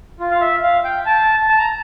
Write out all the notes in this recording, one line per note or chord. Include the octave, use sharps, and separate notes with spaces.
F4
F5
E5
F5
G5
A5
A5
A#5